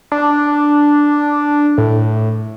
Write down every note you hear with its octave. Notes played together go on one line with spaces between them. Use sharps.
D4
A2